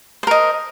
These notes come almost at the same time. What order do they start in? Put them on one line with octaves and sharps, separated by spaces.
C5 A#4 D#5